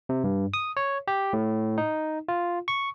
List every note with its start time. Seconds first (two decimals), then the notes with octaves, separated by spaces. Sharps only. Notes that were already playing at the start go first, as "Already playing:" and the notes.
0.09 C3
0.24 G2
0.54 D#6
0.77 C#5
1.08 G4
1.33 A2
1.78 D#4
2.28 F4
2.68 C#6